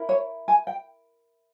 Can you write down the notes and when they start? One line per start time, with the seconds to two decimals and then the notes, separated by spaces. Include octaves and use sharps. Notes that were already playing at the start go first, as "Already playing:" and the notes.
Already playing: E4 A#4
0.09 C#5
0.48 G#5
0.67 G5